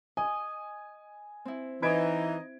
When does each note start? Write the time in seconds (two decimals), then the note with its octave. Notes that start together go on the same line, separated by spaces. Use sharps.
0.17 D#5 G#5
1.45 C4 E4
1.82 E3 D#4 D#5 B5 G#6 D7